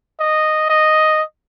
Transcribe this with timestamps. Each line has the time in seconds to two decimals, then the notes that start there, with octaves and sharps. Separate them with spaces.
0.20 D#5
0.70 D#5